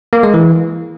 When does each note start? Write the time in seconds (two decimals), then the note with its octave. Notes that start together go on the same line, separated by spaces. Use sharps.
0.13 A#3
0.23 G#3
0.34 E3